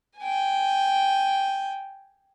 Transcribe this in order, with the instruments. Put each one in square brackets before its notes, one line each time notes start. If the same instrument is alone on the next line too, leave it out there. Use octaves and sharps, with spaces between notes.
[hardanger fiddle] G5 G#5